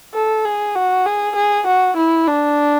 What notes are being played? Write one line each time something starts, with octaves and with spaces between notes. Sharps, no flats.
A4
G#4
F#4
G#4
G#4
F#4
E4
D4